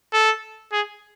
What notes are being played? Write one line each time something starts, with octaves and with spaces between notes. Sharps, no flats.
A4
G#4